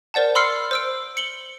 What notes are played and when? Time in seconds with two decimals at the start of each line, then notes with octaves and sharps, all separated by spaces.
0.14 A#4 C5 D5 F#5 A5
0.35 B5 C6 E6 F6 C7 C#7
0.71 C5 E6 D7
1.17 C#7 F#7 G7